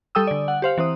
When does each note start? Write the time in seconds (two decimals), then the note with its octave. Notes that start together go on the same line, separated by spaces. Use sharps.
0.15 G3 A4 G5 D#6 E6
0.27 D3 D5
0.48 F#5
0.62 G4 C5 F5
0.78 E3 C4 C5 D#6